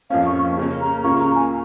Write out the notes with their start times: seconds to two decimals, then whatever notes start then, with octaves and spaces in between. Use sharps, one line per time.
0.10 F2 F3 A#3 C#4 F5
0.26 C#6
0.57 C#3 A#3 C#4
0.81 A#5
1.04 C#2 C#3 A#3 F4 C#6
1.20 A#5
1.35 G#5